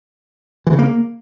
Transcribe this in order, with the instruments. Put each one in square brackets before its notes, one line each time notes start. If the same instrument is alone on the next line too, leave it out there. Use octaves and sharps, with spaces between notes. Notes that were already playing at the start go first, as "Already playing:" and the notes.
[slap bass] E3
C#3
A#3